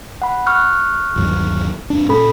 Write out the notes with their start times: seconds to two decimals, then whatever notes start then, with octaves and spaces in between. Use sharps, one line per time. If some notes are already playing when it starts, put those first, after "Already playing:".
0.22 F#5 B5
0.46 C#6 F6 F#6
1.16 G1 D#2 F#3
1.90 F2 D4
2.09 A#2 C#4 A4 B5